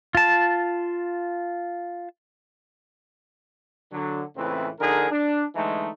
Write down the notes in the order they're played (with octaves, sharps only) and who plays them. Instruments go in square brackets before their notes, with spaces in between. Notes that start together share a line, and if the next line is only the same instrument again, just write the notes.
[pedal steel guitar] F4 A5
[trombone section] D3 F#3
C#2 A2 E3 C4 C#4 B4
A#1 D3 D#4 G#4 A#4
D4
D3 E3 G#3 A3 D#4